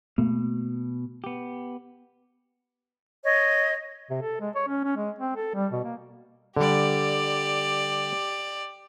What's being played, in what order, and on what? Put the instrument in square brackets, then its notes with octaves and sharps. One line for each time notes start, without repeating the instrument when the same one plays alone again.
[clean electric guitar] B2 [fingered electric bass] A3 A#3
[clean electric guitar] B3 G4
[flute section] C#5 D#5
[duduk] C3
A4
G#3
C#5
C#4
C#4
G#3
C4
A4
G3
B2
A#3
[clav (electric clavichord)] D3 G3 [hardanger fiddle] G4 D5